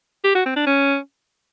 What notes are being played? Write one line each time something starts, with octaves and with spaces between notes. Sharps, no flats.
G4
F#4
C4
D4
C#4